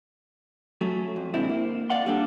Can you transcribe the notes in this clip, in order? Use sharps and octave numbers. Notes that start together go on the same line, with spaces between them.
F#3 A3 C#4
F2
D#2 G#2 C3 C4 D4 E4
A#3
D5 F5 F#5 C6
G3 A#3 D4 A4